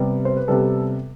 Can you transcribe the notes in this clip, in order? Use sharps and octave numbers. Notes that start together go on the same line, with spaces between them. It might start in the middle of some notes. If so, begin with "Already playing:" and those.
Already playing: C3 G3 B3
C5
B4
C3 G3 B3 A4